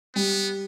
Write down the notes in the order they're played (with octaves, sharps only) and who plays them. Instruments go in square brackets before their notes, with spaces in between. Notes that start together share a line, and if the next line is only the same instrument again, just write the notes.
[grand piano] G3 [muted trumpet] B3